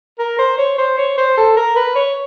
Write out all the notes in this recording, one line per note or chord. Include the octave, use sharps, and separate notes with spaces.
A#4
C5
C#5
C5
C#5
C5
A4
A#4
B4
C#5